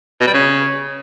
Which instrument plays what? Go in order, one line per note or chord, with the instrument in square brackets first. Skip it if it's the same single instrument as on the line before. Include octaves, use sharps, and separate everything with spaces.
[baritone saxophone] B2
G3
C#3